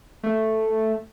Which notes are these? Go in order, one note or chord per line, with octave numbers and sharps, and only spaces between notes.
A3